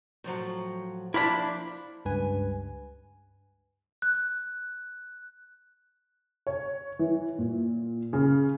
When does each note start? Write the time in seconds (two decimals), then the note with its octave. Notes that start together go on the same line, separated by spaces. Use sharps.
0.24 A2 F3 F#3
1.14 F3 A#3 D4 E4 B5
2.05 C#2 G2 B4 G#5
4.02 F#6
6.47 C#5
6.99 E3
7.39 A#2
8.13 C#3